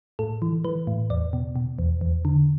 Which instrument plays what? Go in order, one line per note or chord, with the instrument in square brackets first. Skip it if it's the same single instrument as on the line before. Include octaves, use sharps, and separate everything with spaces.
[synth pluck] A2 A4
E3
E3 B4
A2
E2 D5
B2
B2
E2
E2
D3